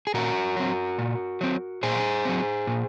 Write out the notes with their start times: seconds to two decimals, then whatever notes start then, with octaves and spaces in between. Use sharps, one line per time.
0.07 G#4
0.14 A#2 F#4 A#4
0.56 F#3 C4
0.98 A#2
1.41 F#3 C4
1.83 A#2 G#4 C5
2.25 F#3 C4
2.67 A#2